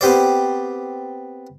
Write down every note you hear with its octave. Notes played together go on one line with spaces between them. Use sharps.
B3 C4 G4 C5 D5